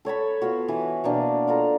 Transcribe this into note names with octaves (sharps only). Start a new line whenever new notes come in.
A4 C#5 A5 B5
B3 F4 F#4
E3
B2 A#3 D4
F4 A4 A#5